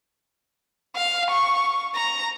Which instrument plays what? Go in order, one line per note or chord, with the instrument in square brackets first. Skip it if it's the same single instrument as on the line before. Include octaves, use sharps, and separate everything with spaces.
[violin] F5
C#6
A#5